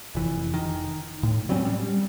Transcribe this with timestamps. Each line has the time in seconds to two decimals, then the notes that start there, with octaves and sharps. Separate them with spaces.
0.15 F1 E3
0.54 D#3
1.23 A2
1.49 F#3 G3 C4 C#4
1.65 G3